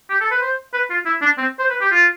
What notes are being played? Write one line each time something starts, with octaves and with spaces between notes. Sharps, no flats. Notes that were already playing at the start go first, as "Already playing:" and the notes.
G4
A4
B4
C5
B4
F4
E4
D4
C4
C5
B4
G4
F4